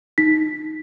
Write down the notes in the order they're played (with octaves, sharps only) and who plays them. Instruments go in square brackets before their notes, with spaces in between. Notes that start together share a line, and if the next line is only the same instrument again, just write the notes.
[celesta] D#4 B6